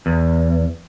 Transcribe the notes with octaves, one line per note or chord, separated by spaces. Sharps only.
E2